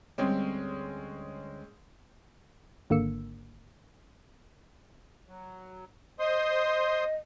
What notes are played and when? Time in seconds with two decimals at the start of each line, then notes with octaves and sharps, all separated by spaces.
0.18 D2 G3 G#3 C4 C#4
2.90 G#1 D3 A#3 E6 C#7
5.28 F#3
6.19 C5 D#5 C6 D#6